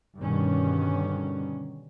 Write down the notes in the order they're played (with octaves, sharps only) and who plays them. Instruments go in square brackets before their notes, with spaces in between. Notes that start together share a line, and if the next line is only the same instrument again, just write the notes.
[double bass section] G2 B2 D3 D#3 C#4